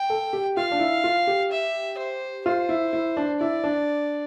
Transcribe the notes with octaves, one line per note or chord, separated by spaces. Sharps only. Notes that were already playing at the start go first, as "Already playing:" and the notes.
Already playing: G5
A4
G4
F4 F5
D4
E4
F4
G4
E5
C5
F4 C5
E4
E4
D4
E4 D5
D4